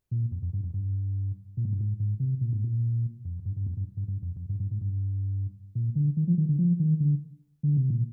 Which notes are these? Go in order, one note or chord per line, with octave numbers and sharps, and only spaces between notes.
A#2
F2
F2
G2
F2
G2
A#2
G#2
G2
G#2
G#2
C3
A#2
G#2
A#2
F2
G2
G2
F2
G2
G2
G2
F2
F2
G2
G2
G#2
G2
A#2
D3
D#3
F3
D#3
D3
F3
D#3
D3
D3
C3
A#2